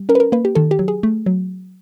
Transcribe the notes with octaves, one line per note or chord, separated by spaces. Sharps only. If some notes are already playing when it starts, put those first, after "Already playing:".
Already playing: G3
C#4 A#4
B4
A#4
A#3 B4
G4
D#3 A4
G4
F#3
G#4
A3
F#3